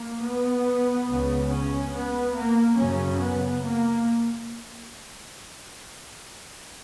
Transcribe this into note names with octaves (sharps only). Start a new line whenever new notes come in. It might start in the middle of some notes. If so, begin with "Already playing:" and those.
Already playing: A#3
B3
C#2 C#3
C#4
B3
A#3
F#2 C#3 C#4
B3
A#3